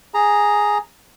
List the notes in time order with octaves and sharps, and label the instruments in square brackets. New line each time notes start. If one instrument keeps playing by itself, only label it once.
[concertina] G#4 A#5